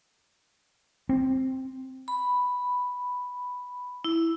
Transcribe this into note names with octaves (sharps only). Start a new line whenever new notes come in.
C4
B5
E4